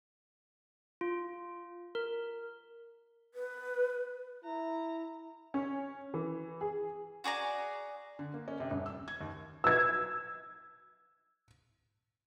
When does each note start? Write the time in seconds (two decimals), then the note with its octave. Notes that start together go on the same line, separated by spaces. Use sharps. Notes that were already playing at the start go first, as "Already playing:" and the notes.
1.01 F4
1.95 A#4
3.34 B4
4.44 E4 A#5
5.54 C#4
6.14 E3
6.61 G#4
7.24 F#4 G#4 D5 A#5
8.19 D3
8.34 A#3
8.48 C#4
8.60 C3
8.71 D#1
8.86 E6
9.08 G#6
9.21 D#2
9.64 E6 G#6